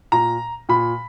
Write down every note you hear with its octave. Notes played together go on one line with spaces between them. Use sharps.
A#2 A#5
A#2 B5